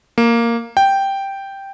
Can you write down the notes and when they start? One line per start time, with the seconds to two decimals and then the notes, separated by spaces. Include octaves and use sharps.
0.18 A#3
0.77 G5